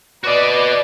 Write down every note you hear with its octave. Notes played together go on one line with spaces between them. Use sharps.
F#4 B4 D5 D#5